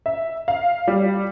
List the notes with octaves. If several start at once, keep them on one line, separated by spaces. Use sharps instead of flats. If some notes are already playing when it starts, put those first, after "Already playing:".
E5
F5
G3